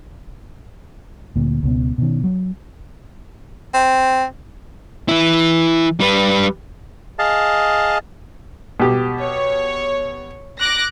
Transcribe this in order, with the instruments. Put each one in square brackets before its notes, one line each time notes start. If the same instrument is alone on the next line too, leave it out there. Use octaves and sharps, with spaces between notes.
[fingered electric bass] D2 A#2
C#2 B2
B2 D#3
F#3
[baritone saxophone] C4
[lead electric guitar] E3 E4
G3 B4
[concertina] G#4 D#5 F5 A5
[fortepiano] B2 G4
[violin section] C#5
D6 F#6 A#6